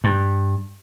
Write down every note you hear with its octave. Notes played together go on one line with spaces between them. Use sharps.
G2